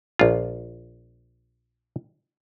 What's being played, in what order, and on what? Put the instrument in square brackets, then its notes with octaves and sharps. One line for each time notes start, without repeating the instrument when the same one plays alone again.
[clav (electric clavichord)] A#1 F4